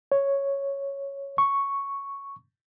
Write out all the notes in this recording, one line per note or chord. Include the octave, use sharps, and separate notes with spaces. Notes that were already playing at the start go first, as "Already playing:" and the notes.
C#5
C#6